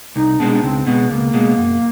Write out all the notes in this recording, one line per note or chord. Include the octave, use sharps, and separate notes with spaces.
C2 D#4
B2 G#3 C4 D4
C#2 C4
B2 G#3 B3
C#2 A#3
B2 G#3
F#2